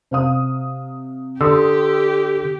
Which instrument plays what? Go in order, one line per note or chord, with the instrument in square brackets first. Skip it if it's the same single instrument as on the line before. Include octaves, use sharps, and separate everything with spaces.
[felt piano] C3 F5 D#6
[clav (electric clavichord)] D3 [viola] G4 [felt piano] C6 D#6 E6